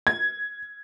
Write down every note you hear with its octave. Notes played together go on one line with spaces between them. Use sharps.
G#6